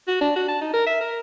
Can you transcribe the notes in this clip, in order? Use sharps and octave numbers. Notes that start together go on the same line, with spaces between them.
F#4
D4
F#4
A5
D#4
A#4
E5
A#4